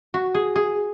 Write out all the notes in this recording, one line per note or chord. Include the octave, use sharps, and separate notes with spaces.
F#4
G#4
G#4